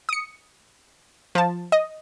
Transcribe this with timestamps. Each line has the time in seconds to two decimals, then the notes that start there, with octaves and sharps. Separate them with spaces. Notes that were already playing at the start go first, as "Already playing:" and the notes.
0.09 D#6 C#7
1.35 F3 A5
1.72 D#5